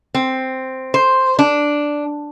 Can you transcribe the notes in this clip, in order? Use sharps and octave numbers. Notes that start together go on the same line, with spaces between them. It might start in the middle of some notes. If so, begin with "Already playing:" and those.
C4
C5
D4